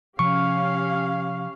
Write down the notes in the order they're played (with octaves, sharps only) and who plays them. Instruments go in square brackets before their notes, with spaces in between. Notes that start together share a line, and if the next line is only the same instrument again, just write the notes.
[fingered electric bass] C3 F3 [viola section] C#4 G4 F5 [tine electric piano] C#6